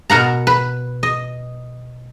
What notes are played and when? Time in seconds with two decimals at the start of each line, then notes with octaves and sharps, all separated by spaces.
0.10 B2 A#4 F#5 A#5
0.47 B4
1.03 D#5